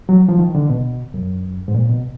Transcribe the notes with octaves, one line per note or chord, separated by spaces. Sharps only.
F#3
F3
D#3
D3
B2
F#2
G#2
A#2
B2